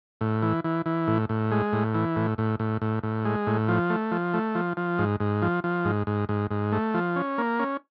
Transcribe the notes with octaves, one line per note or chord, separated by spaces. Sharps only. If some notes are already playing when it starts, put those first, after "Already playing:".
A2
E3
E3
E3
A2
A2
G#3
A2
E3
A2
A2
A2
A2
A2
G#3
A2
F3
A3
F3
A3
F3
F3
G#2
G#2
F3
F3
G#2
G#2
G#2
G#2
A3
F3
C#4
A#3
C#4